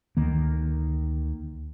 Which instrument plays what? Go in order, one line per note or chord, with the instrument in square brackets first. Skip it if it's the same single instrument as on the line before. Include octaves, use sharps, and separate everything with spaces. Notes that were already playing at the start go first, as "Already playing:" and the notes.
[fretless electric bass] D2 D#3 A#3